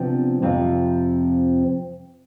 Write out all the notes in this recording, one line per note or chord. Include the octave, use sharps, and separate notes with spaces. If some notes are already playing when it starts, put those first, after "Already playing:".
Already playing: C3 F3 B3 D4
F2 C3 F3 C4 F4